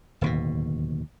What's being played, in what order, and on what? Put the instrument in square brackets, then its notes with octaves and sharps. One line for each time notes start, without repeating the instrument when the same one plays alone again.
[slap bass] D1 D#2 B2